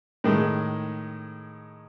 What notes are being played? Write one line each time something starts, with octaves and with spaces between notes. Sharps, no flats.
A2 D#3 G#3